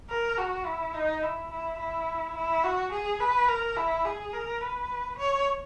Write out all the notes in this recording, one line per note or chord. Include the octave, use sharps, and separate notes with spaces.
A#4
F#4
E4
D#4
E4
E4
E4
E4
F#4
G#4
B4
A#4
E4
G#4
A#4
B4
C#5